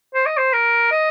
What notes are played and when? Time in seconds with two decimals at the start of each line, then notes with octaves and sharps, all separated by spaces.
0.15 C5
0.26 D#5
0.37 C5
0.53 A#4
0.92 D#5